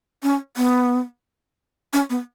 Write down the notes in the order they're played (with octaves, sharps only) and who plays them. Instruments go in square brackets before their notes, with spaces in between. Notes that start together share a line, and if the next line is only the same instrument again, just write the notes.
[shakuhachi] C#4
B3
C#4
B3